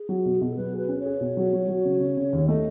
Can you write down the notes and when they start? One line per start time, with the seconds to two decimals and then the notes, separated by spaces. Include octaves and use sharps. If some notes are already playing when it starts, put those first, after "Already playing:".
Already playing: G#4
0.09 F#3
0.25 B2
0.41 B2
0.51 A4
0.57 F#3 B4
0.73 G#4 B4
0.89 C#4
1.00 C#5
1.05 G#4
1.21 B2
1.37 F#3
1.53 F#3
1.68 F#3
1.85 C#3
2.00 C#3
2.17 C#3
2.33 D#2
2.48 A3 D#5